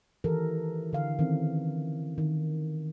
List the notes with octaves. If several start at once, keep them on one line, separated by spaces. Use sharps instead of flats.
D#3 E3 G4 A4 A#4
D3 F5
D#3 E3 C4 C#4
D#3